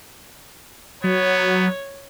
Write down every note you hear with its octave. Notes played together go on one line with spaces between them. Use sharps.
F#3 B3 C#5